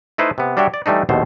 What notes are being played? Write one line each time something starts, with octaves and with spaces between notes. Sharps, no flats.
A3 D#4 E4 B4 C5
C3 B3
G3 D4 F#4 C#5 E5 G5
D5
E3 G3 A3 D4 D#4
A#1 D#2 B2 A3 C5